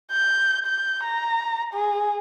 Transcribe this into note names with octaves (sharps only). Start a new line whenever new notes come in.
G6
G6
A#5
G#4